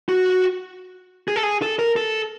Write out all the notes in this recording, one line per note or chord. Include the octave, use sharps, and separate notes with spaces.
F#4
G#4
A4
G#4
A4
A#4
A4